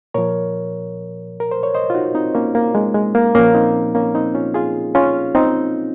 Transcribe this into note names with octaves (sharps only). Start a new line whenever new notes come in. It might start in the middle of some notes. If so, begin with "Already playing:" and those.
A#2 F3 A#4 C#5
A#4
C5
C#5
C5 D#5
F4
D#4 F#4
C4 D#4
A#3 C#4
A#3
G#3
G#3
A#3
A#2 F3 A#3 C#4
C4 D#4
A#3 C#4
C4 D#4
C#4 F4
F4 G#4
C#4 F4
C4 D#4